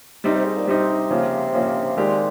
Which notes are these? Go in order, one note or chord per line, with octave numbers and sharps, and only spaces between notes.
C3 G3 C4 D#4
C3
G#2
A#2
C3 G3 C4 D#4
C#3 F3 A#3 C#4
C#3 F3 A#3 C#4
A#2 D#3 G#3 C4 G4